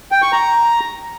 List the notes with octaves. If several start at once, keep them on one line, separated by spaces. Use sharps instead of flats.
G5
C#6
A#5